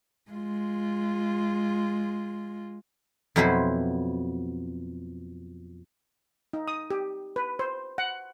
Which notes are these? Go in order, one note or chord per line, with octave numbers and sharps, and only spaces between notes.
G#3 F4
F2 B2 F#3 E4 B4 C5
D#4
D#6
G4
B4
C5
F#5